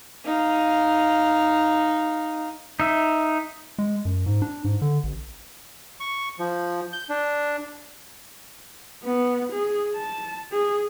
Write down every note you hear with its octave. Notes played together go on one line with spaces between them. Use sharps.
D#4 F5
D#4 E5
G#3
F#2
G#2
D4
G#2
D3
A1
C#6
F3
G6
D4
B3
G#4
A5
G#4